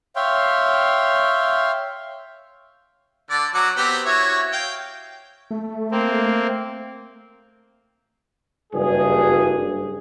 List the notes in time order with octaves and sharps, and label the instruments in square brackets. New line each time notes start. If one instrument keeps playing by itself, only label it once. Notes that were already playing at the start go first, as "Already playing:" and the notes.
[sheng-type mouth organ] C#5 E5 F5 G5 C6
[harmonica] D3 D5
F#3 F#5 D6
B3 C4 G4
E4 F#4 C#5
F5 G5
[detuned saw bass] A3
[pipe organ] A#3 C4
[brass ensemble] F#1 G2 G#4